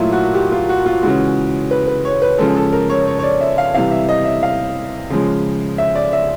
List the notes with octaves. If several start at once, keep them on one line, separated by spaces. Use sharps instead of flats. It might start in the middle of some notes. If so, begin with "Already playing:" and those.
Already playing: A#2 F#3 A3 E4 F4
F#4
G4
F4
F#4
F4
C#3 E3 G#3 F#4
B4
B4
C#5
B4
C#3 F3 G#3 A4
A4
A#4
C#5
C#5
C#5
D5
E5
F5
C3 E3 G3 F5
E5
D#5
E5
F5
C#3 F3 G#3
E5
D5
E5